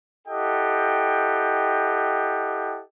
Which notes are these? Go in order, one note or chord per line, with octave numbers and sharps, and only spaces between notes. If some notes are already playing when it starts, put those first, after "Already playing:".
E4 G4 A4 D#5 F#5 G5